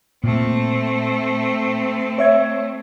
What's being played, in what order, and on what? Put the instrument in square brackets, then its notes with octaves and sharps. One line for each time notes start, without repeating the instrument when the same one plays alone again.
[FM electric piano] A#2 [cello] A3 C4
[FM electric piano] C#5 E5 G#6